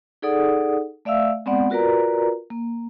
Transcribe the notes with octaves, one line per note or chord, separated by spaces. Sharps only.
D#4 G#4 A4 D5 F#5 D#6
A3 D5 E5 F5 E6
G#3 B3 C4 D5 F#5
F4 F#4 A#4 B4 D5 A#5
A#3